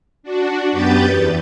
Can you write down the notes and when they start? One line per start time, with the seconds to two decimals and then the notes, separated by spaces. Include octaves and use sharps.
0.23 D4 F#4
0.72 F#2 B3 G4 B4 G6 A6
1.07 E2